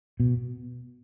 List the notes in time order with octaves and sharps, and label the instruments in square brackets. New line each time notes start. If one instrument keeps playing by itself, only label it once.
[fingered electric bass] B2